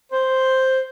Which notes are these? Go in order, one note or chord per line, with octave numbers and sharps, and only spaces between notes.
C5